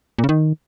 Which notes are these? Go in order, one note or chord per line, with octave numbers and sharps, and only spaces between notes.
A#2
C#3
D#3